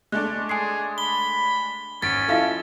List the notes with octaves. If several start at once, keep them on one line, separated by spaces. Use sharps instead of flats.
G#3 A3 D4 F#6
G#4 G#5 C6 C7
B5 G7
G#1 C#4 A6 B6 D7
F3 E4 F4 A4 D#5 F5